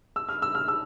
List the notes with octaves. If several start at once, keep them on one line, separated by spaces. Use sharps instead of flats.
E6
F6
E6
F6
E6